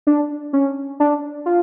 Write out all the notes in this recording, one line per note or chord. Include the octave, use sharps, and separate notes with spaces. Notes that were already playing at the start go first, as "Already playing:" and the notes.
D4
C#4
D4
F4